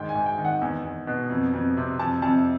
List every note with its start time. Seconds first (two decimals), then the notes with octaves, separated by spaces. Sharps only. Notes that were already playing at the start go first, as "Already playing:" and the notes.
Already playing: G#2 D#3 G5
0.09 G#5
0.15 G#2
0.26 G5
0.38 D#3
0.45 F#5
0.61 E2
0.84 E2
1.07 B2
1.30 F2
1.54 F2
1.77 C3
1.99 F2 A5
2.22 F2 A5